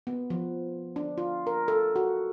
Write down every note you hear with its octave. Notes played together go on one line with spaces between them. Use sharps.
B3
F3
D4
F4
A#4
A4
F#4